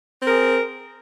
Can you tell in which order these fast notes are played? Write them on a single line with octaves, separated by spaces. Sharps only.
C4 A#4 G#4